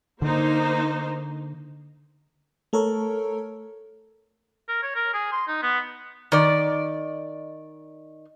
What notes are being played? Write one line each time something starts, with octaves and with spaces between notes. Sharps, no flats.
D3 A#3 D#4 C5
A3 A4 A#4 C#5
A#4
C#5
A#4
G#4
C6
D#4
B3
D#3 D5